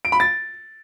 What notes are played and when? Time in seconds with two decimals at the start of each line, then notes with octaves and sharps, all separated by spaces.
0.05 D7
0.12 B5
0.20 A6